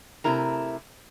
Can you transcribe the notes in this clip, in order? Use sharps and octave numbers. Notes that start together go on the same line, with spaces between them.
C3 A3 E4 A#4 A#5